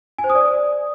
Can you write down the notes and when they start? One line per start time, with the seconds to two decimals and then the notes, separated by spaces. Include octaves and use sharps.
0.18 G#5
0.24 C5
0.30 D#6
0.35 D5